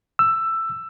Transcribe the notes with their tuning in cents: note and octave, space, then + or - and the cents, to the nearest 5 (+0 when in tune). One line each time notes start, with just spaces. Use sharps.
E6 +15